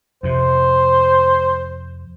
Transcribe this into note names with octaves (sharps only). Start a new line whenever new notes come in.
F2 C3 C5